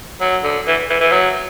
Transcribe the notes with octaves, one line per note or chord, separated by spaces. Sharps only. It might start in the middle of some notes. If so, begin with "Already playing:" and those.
F#3
D3
E3
E3
E3
F#3